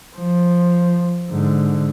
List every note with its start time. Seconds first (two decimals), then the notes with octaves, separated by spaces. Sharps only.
0.16 F3
1.30 G#2 D3